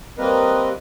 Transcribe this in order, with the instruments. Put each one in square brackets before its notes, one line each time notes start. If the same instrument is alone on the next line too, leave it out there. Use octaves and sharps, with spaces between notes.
[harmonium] G3 A#3 C4 A#4 B4 D#5